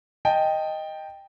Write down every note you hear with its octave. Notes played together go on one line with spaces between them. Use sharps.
D#5 G5 A5